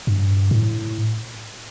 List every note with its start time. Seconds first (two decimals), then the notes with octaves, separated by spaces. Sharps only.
0.07 G2
0.51 A2